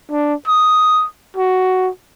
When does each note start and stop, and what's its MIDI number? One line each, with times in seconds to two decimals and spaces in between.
0.11 0.34 62
0.48 1.06 87
1.37 1.90 66